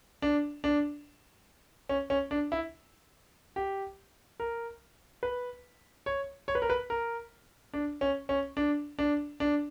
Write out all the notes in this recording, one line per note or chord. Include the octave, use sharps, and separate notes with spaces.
D4
D4
C#4
C#4
D4
E4
G4
A#4
B4
C#5
C#5
B4
A#4
B4
A#4
D4
C#4
C#4
D4
D4
D4